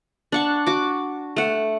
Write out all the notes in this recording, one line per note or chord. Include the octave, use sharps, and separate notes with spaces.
D4 F#5 C#6
F#4 D6
A3 F#5